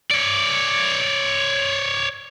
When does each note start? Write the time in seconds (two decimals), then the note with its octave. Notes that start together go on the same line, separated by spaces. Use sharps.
0.11 C#5 D5